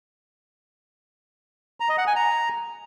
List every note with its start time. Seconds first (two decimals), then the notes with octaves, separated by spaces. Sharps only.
1.80 A#5
1.89 D#5
1.98 F#5
2.07 G#5
2.16 A#5